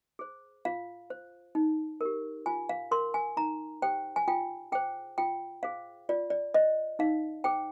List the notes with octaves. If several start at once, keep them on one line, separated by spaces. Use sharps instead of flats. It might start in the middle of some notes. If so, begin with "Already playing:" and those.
G#4 C5
F4 F5
C5
D#4
G4 A#4
F4 G#5
F5
A#4 C6
G#5
D#4 A#5
G4 C5 G5
G#5
F4 G5
G#4 C5 G5
F4 G5
G#4 C5 F5
F4 D5
D5
C5 D#5
D#4 F5
G#4 C5 G5